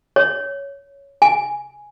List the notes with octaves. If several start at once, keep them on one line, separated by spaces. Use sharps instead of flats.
C#5
G#5